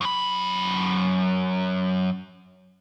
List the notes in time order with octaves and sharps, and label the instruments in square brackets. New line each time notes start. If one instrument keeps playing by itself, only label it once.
[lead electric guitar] F#2 B5